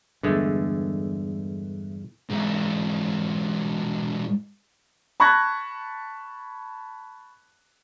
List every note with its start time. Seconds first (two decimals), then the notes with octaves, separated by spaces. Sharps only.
0.23 E2 G2 D3 G#3 A3
2.29 G#2 E3
5.20 A5 B5 C#6 F#6 G#6 A#6